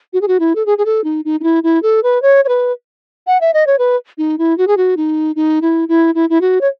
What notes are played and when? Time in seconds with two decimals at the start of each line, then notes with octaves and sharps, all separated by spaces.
0.13 F#4
0.21 G#4
0.28 F#4
0.40 E4
0.55 A4
0.66 G#4
0.78 G#4
0.86 A4
1.04 D#4
1.25 D#4
1.40 D#4
1.43 E4
1.63 E4
1.82 A4
2.03 B4
2.22 C#5
2.45 C#5
2.48 B4
3.27 F#5
3.41 E5
3.54 D#5
3.67 C#5
3.79 B4
4.18 D#4
4.38 E4
4.58 F#4
4.67 G#4
4.77 F#4
4.97 D#4
5.36 D#4
5.62 E4
5.88 E4
6.15 E4
6.30 E4
6.41 F#4
6.61 C#5